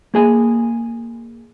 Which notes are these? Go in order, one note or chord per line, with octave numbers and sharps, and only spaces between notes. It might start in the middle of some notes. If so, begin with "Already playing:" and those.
A#3 G#4 G#5